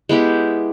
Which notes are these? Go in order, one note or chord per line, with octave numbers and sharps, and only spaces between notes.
G#3 B3 E4 G4